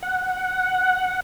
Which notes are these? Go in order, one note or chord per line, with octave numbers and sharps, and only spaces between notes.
F#5